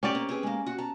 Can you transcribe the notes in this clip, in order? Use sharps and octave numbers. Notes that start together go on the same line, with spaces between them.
C#4 G4 D5
A#3 C4
C4 G#4 B4
G#3 A#3
F#4
A5 A#5